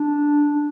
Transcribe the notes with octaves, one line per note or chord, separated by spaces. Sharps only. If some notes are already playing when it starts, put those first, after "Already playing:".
Already playing: D4
D4